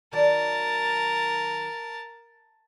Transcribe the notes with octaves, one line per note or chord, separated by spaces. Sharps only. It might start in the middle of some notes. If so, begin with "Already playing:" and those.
D#3 F#3 A#4 D5 A5